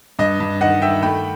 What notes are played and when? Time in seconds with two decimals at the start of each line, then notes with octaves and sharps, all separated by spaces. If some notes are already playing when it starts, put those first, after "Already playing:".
0.19 G2 D#5
0.40 G2
0.61 D#3 D#5 F#5
0.82 D#3 E5 G5
1.02 A3 G5 B5